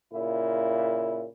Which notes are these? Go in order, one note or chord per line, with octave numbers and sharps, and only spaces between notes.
A#2 C#3 E4